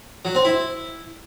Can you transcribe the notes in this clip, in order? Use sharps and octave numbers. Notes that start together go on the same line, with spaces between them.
F#3
C4
E4